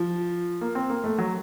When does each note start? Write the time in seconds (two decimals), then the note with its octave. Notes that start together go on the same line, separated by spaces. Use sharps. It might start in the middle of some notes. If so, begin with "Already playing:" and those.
Already playing: F3
0.61 A#3
0.75 C4
0.90 A#3
1.04 A3
1.18 F#3